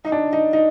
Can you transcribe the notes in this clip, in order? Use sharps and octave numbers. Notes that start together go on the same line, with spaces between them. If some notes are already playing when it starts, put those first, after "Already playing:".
D#4
D4
D#4
D#4